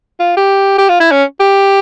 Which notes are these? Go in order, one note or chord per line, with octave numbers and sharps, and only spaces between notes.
F4
G4
G4
F4
E4
C#4
G4